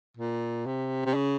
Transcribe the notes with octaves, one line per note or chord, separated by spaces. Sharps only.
A#2
C3
C3
C#3